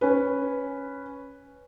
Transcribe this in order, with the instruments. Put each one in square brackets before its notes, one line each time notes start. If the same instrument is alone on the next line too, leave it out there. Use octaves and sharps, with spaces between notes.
[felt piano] C#4 B4